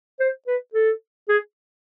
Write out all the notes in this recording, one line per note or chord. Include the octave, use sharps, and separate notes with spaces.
C5
B4
A4
G#4